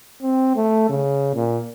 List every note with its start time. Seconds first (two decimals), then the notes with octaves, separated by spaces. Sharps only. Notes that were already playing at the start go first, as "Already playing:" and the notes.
0.22 C4
0.56 A3
0.89 C#3
1.34 A#2